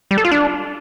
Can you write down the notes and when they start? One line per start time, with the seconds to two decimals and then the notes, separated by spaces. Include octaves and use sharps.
0.11 G3
0.18 A4
0.25 F4
0.31 D4